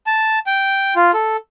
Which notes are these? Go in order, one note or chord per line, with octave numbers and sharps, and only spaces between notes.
A5
G5
F4
A4